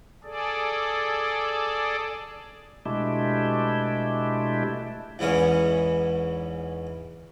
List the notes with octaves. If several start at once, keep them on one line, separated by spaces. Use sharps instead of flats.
G#4 A4 D5
B2 G#3 A3 D4 E4 G4
E2 G#2 E3 B3 C#4 F#5